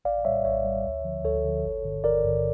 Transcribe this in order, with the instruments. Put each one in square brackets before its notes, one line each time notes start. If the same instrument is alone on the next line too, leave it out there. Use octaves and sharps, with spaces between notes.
[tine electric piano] A#1 D5 F5
A2 G3 C#5 E5
A#1 C#5 E5
A2 G3
D2
D3 F3
D2 A4 C#5
D3 F3
G1
G2 D3
G1 A#4 D5
G2 D3